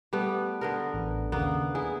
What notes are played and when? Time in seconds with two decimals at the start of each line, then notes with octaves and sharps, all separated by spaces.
0.13 G3 A3 B3
0.61 D3 B3 A#4
0.94 A1
1.32 D#2 C#3 A#3 B3
1.75 E4 G#4